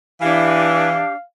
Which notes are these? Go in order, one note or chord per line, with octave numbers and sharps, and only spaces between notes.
E3 D4 G4 F5